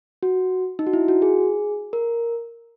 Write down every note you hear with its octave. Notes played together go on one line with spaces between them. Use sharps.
F#4
D#4
F#4
E4
F#4
G#4
A#4